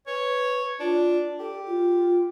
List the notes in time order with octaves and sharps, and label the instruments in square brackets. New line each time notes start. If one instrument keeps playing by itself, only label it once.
[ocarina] B4 [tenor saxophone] C#5
[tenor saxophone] D4 [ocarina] F4
[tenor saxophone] G4 [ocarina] A4
[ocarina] F4